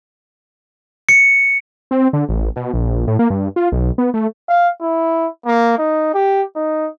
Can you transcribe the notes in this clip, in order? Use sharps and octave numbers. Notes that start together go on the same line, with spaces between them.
C#7
C4
D3
A1
B2
A#1
A2
A#3
G2
F4
B1
B3
A3
F5
E4
A#3
D#4
G4
D#4